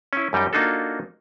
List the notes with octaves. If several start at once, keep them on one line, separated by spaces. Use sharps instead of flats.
C#4 E4
F#2 G3 D#4 G5
A#3 D4 D#4 F4 F#4 A4